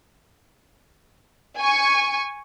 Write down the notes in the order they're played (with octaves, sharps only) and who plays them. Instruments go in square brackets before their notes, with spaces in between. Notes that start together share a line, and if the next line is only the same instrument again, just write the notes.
[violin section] G#5 C#6